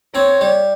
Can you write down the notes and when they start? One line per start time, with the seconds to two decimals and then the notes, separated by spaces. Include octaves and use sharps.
0.15 C4 C#5
0.41 G3